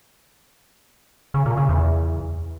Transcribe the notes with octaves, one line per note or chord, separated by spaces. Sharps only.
C#3
A#2
C#3
E2